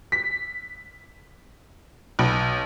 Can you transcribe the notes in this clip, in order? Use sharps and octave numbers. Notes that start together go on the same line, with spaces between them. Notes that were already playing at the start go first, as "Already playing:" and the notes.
B6
B1